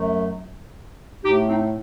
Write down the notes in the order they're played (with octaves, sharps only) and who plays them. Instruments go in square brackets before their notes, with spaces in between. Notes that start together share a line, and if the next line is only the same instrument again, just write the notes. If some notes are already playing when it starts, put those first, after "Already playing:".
Already playing: [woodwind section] F#2 F#3 A3
A2 A3 D#4 G4
C4 D#4